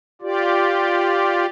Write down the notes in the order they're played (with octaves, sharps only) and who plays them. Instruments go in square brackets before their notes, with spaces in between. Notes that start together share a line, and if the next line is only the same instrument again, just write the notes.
[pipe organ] F4 G4 D5